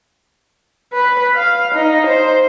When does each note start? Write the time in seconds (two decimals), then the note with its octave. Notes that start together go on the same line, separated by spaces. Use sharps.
0.93 B4
1.36 F5
1.75 D#4
2.07 C5